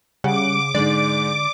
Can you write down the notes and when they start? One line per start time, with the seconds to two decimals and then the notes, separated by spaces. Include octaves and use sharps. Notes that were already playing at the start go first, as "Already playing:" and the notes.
0.24 C#3 G3 F#5 D6
0.75 G#2 D3 G#3 D5